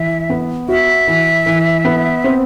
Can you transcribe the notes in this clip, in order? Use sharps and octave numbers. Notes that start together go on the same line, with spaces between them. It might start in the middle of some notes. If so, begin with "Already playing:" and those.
Already playing: E3 E5
B3
F#4 E5
E3
E3
B3
C4